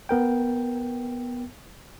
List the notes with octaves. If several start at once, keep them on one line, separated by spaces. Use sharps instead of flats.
B3 A#4 G5